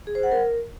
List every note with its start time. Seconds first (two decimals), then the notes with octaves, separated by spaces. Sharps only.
0.07 G#4
0.15 C5
0.23 F#5
0.31 A#4